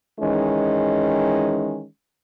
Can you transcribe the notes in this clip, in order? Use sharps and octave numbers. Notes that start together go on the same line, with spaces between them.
D#3 E3 G#3 C#4